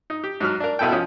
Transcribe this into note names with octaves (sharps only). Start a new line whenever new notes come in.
D#4
G4
G#2 F#3 F6
D4 A#4
C2 B2 B3 E4 A4 G5
F3 C#4 D#6